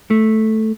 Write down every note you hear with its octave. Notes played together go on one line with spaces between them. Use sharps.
A3